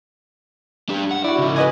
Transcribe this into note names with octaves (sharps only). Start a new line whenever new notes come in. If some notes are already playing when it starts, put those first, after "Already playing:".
D4 G4
F#5
E4 F#4 D5
C#3 D#4
B4 D#5 G#5